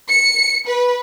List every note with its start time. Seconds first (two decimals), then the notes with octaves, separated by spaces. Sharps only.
0.10 C#7
0.67 B4